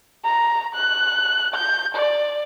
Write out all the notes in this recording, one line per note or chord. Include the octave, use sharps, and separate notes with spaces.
A#5
F#6
G6
D5